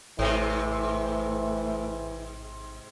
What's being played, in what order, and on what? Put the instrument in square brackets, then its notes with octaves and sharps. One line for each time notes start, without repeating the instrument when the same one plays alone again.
[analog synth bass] A1 [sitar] G#2 C3 [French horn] E3 [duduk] A3